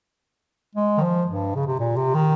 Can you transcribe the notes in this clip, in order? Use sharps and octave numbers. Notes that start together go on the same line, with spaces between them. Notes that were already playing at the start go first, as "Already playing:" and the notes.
G#3
D#3
F3
G2
C#3
C3
A#2
C3
D#3